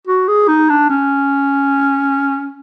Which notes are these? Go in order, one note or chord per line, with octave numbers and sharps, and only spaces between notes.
F#4
G#4
D#4
D4
C#4